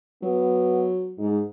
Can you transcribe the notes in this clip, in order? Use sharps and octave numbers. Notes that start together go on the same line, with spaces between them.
F#3 B3
G#2